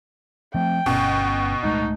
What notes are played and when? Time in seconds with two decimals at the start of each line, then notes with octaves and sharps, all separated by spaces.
0.55 F3 A3 C4 G5
0.86 G1 B2 C#4
1.63 D1 G#3 A3 D#4